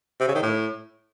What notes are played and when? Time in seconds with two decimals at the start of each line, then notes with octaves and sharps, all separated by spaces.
0.21 C3
0.28 C#3
0.35 D#3
0.42 A2